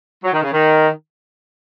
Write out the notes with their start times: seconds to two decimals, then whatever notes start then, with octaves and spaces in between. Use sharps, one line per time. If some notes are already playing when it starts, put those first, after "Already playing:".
0.24 F#3
0.33 D#3
0.43 C#3
0.53 D#3